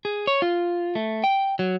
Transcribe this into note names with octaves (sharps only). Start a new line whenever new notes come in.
G#4
C#5
F4
A3
G5
F#3